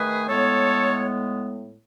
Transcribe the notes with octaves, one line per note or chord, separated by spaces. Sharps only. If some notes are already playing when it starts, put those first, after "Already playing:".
Already playing: D#3 A3 G#4 B4
A2 G#3 B3 A4 C#5